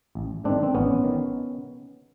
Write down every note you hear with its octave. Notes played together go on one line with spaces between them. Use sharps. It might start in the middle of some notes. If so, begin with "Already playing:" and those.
A1
G#2 D#3 C4 D4
C4
A1 B3 C#4
D#3